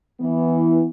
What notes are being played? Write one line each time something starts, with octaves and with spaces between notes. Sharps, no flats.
E3 B3